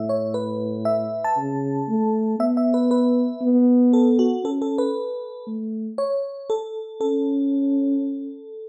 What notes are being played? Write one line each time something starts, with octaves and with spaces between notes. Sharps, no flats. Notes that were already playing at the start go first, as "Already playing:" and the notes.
Already playing: A2 E5
C#5
B4
E5
A5
C#3
A3
B3 E5
E5
B4
B4
B3
A4
F#4
C#4 A4
A4
B4
A3
C#5
A4
C#4 A4